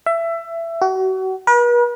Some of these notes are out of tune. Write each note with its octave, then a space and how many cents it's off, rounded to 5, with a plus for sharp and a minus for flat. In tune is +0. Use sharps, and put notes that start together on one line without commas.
E5 +20
F#4 +35
B4 -45